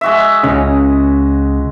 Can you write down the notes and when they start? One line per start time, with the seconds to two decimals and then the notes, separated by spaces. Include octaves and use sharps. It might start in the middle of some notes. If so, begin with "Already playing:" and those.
0.01 G#3 F#4 E5
0.43 C#2 C#3 C#4 D#5